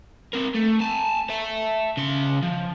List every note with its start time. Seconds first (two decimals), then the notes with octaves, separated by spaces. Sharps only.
0.33 C4 A#4
0.55 A3
0.80 G#5 A5
1.30 E5 A5
1.97 C#3 C6
2.42 F3